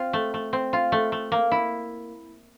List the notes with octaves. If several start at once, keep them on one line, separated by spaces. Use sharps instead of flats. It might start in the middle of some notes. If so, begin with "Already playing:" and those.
Already playing: C4 F4
A3
A3
C4
F4
A3
A3
A#3
E4